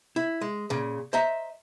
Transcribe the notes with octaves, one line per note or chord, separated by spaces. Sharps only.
E4
G#3
A#2 C#3
C5 D#5 E5 A#5